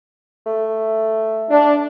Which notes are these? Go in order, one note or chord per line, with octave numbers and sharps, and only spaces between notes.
A3
D4